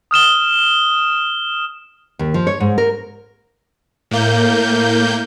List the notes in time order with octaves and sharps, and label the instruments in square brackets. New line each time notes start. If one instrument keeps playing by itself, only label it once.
[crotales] D#6 F6 E7 G7
[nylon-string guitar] D#2
F3
C#5
G#2
A#4
[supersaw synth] A2 A#3 G6